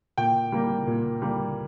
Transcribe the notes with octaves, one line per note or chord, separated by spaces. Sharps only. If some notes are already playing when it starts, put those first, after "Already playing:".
A#2 G5
G3 A#3
A#2
G3 A#3